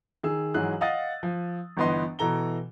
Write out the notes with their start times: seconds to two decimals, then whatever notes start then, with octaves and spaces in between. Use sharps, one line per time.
0.23 D#3 G#4 E6
0.54 G#2 E3 F#3 G#4 F#6
0.81 D#5 F5 F#5 D#6 A6
1.23 F3
1.77 G1 E3 B3 D#5 C6
2.19 B2 E3 A4 A#5 G7